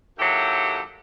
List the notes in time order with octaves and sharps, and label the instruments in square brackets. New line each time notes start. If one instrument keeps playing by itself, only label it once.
[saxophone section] D#2 F#3 E4 G4 A4 F#5